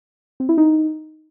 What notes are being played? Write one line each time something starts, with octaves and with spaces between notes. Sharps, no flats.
C4
E4
D#4